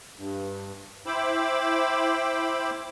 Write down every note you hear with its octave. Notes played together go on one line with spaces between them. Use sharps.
G2
E4 C5 G5 B5 D6 E6